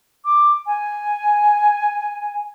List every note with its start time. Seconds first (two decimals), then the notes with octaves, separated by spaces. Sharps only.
0.25 D6
0.66 G#5